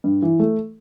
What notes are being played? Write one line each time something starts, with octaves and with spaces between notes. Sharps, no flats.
G2
E3
A3